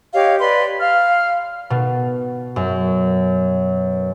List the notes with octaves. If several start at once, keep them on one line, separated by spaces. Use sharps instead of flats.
G4 C#5 D#5 F5
B4 D5 C6
F5 F6
B2
F#2